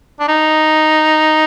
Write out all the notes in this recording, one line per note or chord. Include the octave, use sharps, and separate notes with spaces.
D4
D#4